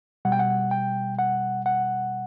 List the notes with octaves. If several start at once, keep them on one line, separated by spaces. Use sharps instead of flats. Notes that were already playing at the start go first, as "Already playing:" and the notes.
B2 G3 F#5
G5
F#5
G5
F#5
F#5